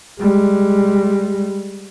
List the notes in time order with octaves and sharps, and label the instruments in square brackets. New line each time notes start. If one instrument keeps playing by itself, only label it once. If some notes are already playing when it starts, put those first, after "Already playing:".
[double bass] G3 G#3